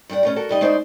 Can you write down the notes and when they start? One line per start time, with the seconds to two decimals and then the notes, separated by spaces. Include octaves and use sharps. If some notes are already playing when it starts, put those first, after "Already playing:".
0.10 G2 G3 G4 F#5
0.23 B2 A3 C#4
0.36 F#4 A4 A#4
0.49 G#2 G3 D#5
0.61 G#3 C#4 D#4 E4 C5 D5